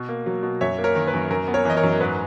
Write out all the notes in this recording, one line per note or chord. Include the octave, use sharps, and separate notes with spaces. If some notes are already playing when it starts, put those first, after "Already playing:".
Already playing: B2
A#3
F#3
B2
F#2 C#5 E5
A#3
A#4 C#5
D#3
B4
F#2
F#2 A#4
B3
A#4 C#5
E3 D#5
A#4 C#5
F#2
G#2 B4